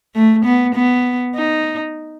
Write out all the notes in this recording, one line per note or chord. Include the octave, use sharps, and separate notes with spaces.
A3
B3
B3
D#4